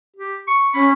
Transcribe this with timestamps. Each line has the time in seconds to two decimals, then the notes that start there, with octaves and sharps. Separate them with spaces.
0.16 G4
0.48 C#6
0.74 C#4 B5